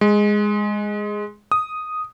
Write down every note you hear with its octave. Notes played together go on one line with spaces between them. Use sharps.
G#3
D#6